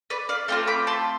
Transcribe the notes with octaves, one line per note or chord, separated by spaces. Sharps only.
B4 D5
D5 F5
A3 C4 F4 D5 F5
B5 D6
A5 C6